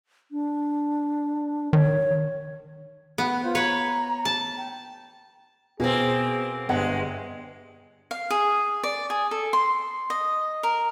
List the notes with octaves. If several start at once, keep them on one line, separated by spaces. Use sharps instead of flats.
D4
D#3 C#5
B3 F#5
F4 B4 C5
B4 C#5 A#5
A5
G5
B2 A#3 C4 G#4
G1 G2 G#3 F#5
F5
G#4
D5
G#4
A4
C6
D#5
A#4